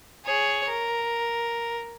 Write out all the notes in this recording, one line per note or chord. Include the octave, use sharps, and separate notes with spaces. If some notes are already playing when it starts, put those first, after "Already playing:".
G#4 C#5
A#4